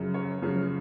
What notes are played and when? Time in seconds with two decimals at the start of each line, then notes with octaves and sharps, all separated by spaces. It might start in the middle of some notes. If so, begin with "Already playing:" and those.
Already playing: F#2 C#3 F3
0.14 C#5
0.42 F#2 C#3 F3